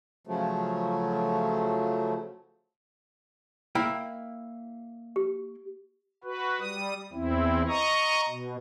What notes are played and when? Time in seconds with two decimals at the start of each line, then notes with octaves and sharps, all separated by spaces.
0.27 C#3 F3 F#3 A3
3.75 A#3 E4 G5
5.16 G4
6.24 F#4 B4
6.60 G3 D#6
7.13 E2 C4 E4
7.68 D#5 A#5 C#6 D#6
8.29 B2